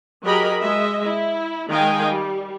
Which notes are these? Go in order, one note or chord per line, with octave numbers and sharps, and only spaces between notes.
F#3 G4 G#4 A#4 D#5 B5
G#3 D#5 E5
E4
D#3 G#3 D#5 F5 G5 G#5
G3